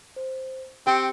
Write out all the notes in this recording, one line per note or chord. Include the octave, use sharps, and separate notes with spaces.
C5
C4 G4 G5 C#7